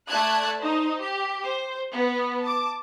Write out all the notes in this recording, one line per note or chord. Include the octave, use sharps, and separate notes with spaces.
A3 D5 A5 F#6 G#6
D#4 C5
G4
C5
B3
A5 D6